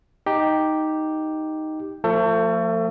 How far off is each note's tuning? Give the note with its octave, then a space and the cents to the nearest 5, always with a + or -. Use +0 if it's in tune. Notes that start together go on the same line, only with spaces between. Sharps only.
D#4 +0 G4 +0
F3 +0 A3 +35 A4 +25